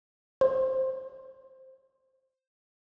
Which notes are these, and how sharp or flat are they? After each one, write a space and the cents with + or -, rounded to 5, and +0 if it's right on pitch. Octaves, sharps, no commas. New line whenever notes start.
C5 +10